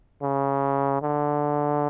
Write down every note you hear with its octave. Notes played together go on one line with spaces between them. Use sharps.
C#3
D3